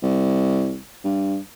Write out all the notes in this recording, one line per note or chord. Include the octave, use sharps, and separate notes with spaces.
C2
G2